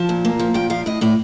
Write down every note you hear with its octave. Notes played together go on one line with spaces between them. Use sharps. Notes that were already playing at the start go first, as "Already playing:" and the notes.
Already playing: F3 A5
A#2
A#3
F3
A#2 G5
F3 F5
A2 D#5
A2 D5